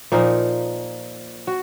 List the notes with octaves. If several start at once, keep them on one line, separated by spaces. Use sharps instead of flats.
A#2 F3 A#3 D#4
F#4